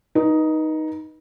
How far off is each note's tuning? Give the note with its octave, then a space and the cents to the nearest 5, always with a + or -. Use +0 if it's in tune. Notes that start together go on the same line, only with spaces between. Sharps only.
D#4 +5 B4 -35